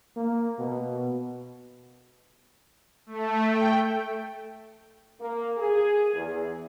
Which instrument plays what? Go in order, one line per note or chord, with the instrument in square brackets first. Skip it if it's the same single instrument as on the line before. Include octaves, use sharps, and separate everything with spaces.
[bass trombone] A#3
B2
[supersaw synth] A3
G5
[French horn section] A#3
G#4
E2